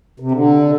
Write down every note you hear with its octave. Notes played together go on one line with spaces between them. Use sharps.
C3
D3